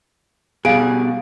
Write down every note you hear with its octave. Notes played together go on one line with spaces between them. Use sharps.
B2 G3 G#4 F5 D7